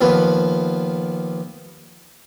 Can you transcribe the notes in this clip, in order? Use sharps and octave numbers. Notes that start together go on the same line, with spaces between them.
D#2 F3 B3 B4